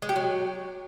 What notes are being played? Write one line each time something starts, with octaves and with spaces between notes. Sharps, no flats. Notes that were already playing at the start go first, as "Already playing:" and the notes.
G#3
G4
F#3